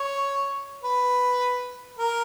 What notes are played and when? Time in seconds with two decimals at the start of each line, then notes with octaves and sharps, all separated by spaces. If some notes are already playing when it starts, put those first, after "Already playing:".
Already playing: C#5
0.83 B4
1.99 A#4